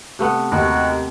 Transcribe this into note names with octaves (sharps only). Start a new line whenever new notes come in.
C3 A3 B3
D#2 F#4